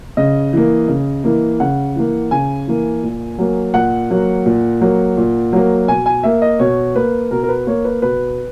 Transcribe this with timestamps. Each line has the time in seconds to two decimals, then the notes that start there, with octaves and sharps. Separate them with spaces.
0.17 C#3 D#5
0.53 E3 A#3
0.88 C#3
1.24 E3 A#3
1.60 C#3 F#5
1.96 E3 A#3
2.31 C#3 G#5
2.67 E3 A#3
3.03 A#2
3.38 F#3 A#3
3.74 A#2 F#5
4.10 F#3 A#3
4.46 A#2
4.81 F#3 A#3
5.17 A#2
5.52 F#3 A#3
5.88 B2 G#5
6.06 G#5
6.23 A#3 E5
6.42 D#5
6.59 B2 C#5
6.95 A#3 B4
7.31 B2 A#4
7.43 A#4
7.49 B4
7.67 A#3 C#5
7.85 B4
8.02 B2 B4